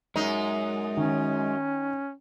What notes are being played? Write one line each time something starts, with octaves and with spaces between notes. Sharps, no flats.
F#2 G#3 D#4
D#3 C#4